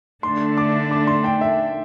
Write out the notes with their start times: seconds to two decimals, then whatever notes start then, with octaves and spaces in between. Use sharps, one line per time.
0.23 D3 A3 D4 C6
0.57 D6
0.91 D6
1.07 C6
1.24 G5
1.41 E5